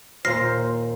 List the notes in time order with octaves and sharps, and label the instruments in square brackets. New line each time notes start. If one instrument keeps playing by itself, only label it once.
[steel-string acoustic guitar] D#2 A#2 [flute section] C5 [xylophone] F6 A#6 C7